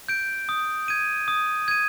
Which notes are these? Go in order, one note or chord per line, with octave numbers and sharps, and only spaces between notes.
G6 D7
D#6
G#6 D#7
D#6
G#6 D#7